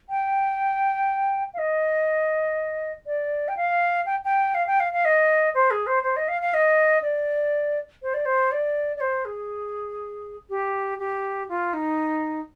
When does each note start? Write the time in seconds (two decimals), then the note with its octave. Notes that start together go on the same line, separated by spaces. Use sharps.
0.10 G5
1.54 F5
1.58 D#5
3.06 D5
3.48 G5
3.57 F5
4.06 G5
4.25 G5
4.55 F5
4.67 G5
4.80 F5
4.93 F5
5.05 D#5
5.54 C5
5.71 G#4
5.87 C5
6.03 C5
6.16 D#5
6.28 F5
6.41 F5
6.54 D#5
7.02 D5
8.02 C5
8.14 D5
8.25 C5
8.52 D5
8.96 D5
9.00 C5
9.25 G#4
10.49 G4
10.99 G4
11.49 F4
11.73 D#4